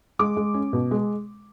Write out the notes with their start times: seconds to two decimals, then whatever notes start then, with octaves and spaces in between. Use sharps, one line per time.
0.19 G#3 D6
0.37 G#3
0.54 C#4
0.73 B2
0.91 G#3